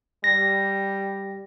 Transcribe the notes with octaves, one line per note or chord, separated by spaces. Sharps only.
G3 A#6